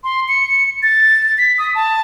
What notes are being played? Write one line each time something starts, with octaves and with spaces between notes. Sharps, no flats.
C6
C#7
A6
B6
D#6
A5